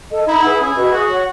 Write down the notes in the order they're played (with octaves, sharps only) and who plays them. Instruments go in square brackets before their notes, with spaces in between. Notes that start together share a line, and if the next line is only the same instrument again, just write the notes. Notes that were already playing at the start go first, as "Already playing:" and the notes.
[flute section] A4 D#5
[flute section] D#4 [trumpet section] E4
[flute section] G#4 B4 F#5
[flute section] C#4 [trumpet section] E4 G#4
[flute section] F#4 B4 D#5
[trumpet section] F#4 [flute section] G#4
[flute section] C#5 F#5